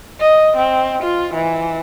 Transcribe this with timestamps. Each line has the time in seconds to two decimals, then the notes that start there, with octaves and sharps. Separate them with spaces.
0.20 D#5
0.57 C4
1.03 F4
1.34 E3